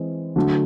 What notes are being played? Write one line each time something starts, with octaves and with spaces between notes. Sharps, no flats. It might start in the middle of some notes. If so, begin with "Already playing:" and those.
Already playing: E3 G#3 C4
D3 F#3 A3